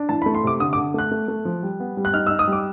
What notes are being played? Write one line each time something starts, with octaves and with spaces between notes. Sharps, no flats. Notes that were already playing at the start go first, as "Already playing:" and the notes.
Already playing: D4
E3 A5
B5
A3
C6
C3 D6
D3 D#6
D6
D3
A3 F#6
A3
A3
F3
G3
B3
G3
F#6
D#4 F6
E6
D#4
D#6
G3
D6